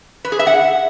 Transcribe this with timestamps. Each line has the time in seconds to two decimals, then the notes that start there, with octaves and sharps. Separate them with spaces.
0.25 B4
0.32 G#4
0.39 E5
0.47 F#5